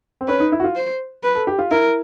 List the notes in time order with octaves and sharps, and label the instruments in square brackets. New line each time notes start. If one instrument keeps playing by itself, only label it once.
[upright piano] C4
[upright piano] C#4 [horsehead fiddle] B4
[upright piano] D#4
E4
F#4
F4
[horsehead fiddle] C5
B4
[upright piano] A4
G4
F4
[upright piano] E4 [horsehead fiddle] A#4